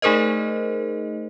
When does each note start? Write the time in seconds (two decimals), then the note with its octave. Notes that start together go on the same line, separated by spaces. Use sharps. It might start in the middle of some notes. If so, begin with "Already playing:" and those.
0.02 A3 D#4 G#4 A#4 C5 D#5